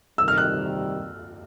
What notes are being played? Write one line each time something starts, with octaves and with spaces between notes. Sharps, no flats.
C3 D#3 G3 E6
F6
F#6